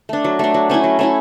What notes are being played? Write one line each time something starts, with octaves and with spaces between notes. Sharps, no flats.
A3 D4
F#3
A3 D4
F#3
A3 C#4 E4
F#3
A3 C#4 E4